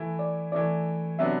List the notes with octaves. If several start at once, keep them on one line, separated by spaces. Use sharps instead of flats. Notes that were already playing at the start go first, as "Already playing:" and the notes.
Already playing: E3 A3 E4
D5
E3 A3 E4 D5
C3 F#3 B3 D4 E5